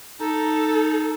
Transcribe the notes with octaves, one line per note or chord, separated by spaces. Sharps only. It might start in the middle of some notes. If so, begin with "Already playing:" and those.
D#4 A4